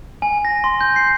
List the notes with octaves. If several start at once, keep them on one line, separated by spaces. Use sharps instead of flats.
G#5
A#6
C6
G6
C7